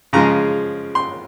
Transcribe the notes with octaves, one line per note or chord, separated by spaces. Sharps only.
C#3 F3 G#3 A#5
C6